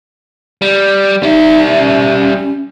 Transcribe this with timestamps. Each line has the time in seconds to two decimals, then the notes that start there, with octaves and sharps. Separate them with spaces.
0.62 G3
1.23 G3 D#4 E5
1.77 C#4